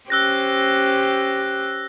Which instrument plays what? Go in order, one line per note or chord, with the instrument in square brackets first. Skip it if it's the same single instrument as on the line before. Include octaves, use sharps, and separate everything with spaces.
[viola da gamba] C#4 G4 C5 [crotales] E6 F#6 A#6